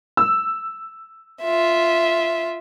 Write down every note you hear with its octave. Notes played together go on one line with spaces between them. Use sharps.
E6
F4 E5